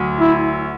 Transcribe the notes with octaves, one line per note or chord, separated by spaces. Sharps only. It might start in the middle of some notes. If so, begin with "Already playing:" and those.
Already playing: D2 F#3
E4